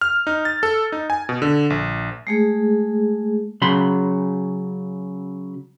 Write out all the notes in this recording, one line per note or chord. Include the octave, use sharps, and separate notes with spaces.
F6
D#4
A6
A4
D#4
G#5
B2
D3
A#1
G#3 A3 G#4
C#3 F#3 B5 C6